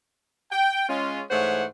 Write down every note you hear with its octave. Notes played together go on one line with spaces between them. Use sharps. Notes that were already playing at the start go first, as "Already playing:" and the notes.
G5
G#3 C#4 F4
G#2 E3 A3 C5 C#5 F#5